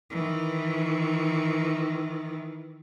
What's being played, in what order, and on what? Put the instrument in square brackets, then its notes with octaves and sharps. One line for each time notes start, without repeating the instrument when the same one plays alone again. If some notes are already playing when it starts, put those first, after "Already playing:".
[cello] D#3 E3